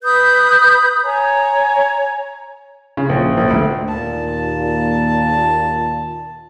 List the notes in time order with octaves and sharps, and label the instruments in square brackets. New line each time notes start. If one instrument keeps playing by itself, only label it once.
[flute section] B4 B5 D#6 G6
C#5 G#5 A#5
[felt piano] C#3
A#1
A#1
D2
[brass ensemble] D#2 A#2 [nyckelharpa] A5